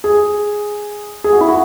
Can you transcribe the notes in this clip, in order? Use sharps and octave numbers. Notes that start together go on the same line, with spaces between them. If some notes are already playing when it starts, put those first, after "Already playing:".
G#4
G#4
F#4
E4
F#4